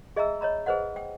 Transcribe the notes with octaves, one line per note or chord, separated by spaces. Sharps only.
G#4 D#5 E5 G#5 A#5 E6
C#5 D#5 A#5 B5
G#4 B4 C5 D#5 F#5
G5